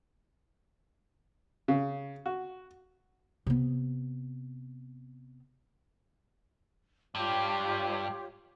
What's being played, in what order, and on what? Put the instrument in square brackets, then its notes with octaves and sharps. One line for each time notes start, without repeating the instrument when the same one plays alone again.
[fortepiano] C#3
F#4
[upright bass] C3 B3
[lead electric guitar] G2 [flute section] F4 G4 C#5